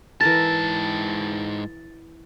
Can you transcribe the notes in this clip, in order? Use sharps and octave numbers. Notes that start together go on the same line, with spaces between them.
G#2 E3 A4 A#4 A5 A6